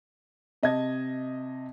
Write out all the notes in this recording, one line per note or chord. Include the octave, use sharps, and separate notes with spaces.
C3 D#5 A5 G#6